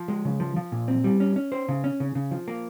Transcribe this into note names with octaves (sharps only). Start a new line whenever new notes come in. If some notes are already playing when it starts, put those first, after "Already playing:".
Already playing: F3
G#3
C#3
F3
F3
A#2
C4
G3
C#4
C#4
C5
C#3
C#4
C#3
C#3
F3
A#3